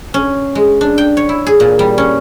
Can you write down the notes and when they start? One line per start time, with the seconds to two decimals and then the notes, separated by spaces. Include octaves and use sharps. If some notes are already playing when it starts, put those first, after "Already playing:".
0.14 C#4
0.55 G#3
0.81 D4
0.98 G5
1.17 C#5
1.29 E4
1.46 G#4
1.60 A#2
1.79 G3
1.98 C#4